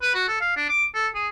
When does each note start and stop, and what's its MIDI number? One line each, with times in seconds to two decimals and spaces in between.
0.02 0.12 71
0.15 0.24 66
0.28 0.39 69
0.41 0.55 77
0.57 0.66 62
0.69 0.85 86
0.94 1.08 69
1.15 1.28 68